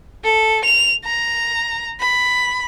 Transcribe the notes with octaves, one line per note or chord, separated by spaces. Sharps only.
A4
F7
A#5
B5